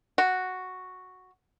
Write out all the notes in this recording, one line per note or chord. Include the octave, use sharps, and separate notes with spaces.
F#4